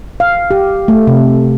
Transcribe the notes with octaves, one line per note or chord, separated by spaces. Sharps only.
F5
G4
A3
C3